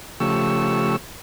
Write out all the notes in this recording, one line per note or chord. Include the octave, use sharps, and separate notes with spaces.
C#3 F3 A3 G4 C#6 E6